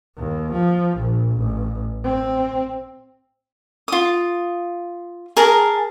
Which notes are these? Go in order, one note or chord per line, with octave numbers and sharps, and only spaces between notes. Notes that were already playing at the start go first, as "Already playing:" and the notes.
D#2
F3
A#1
A1
C4
F4 D#6
G#4 A#4 A5 A#5